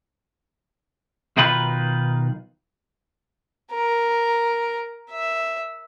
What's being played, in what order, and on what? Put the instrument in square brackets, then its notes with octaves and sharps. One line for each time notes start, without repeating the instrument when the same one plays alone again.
[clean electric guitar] B1 D#3 D#4 F4 B4 B5
[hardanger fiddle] A#4
E5